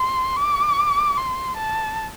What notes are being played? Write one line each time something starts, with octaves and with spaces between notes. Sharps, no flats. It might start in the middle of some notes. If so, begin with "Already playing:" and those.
Already playing: C6
D6
C6
A5